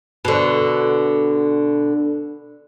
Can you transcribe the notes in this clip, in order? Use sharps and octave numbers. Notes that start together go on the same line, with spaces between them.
B2 D3